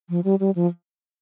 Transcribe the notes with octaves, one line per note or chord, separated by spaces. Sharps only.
F3
G3
G3
F3